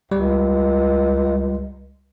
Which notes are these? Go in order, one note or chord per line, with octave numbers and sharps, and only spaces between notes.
C#2 G3